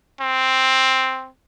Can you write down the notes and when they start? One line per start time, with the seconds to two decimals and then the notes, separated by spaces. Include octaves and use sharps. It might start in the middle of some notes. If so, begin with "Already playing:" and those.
0.21 C4